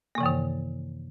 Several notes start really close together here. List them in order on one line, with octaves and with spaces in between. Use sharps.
A#3 C3 E3 F#2 D#3